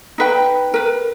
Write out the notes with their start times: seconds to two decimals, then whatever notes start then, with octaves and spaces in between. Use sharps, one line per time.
0.18 D#4 B4 G5
0.74 A#4 B4